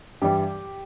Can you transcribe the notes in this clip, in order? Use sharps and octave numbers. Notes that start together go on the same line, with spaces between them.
G2 E3 G3 G4